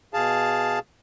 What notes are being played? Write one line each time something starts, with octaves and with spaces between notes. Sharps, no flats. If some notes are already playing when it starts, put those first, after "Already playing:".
B2 G#4 F5 A5